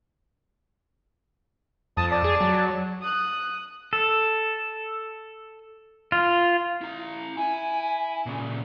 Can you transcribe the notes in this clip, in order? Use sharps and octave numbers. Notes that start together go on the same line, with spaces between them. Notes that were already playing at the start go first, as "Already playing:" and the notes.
F2 A5 D#6
D5 A5
G#4
F#3
D#6 F#6
A4
F4
E4 A#5
E4 G#5
A#2 C#3